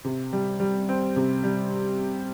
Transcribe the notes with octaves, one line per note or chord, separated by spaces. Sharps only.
C3
G3
G3
C4
C3
G3